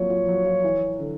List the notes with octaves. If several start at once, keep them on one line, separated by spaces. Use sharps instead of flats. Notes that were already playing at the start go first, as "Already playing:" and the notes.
Already playing: F3 F#3 A#3 C4 C#5
F3
F#3
F3
E3
D3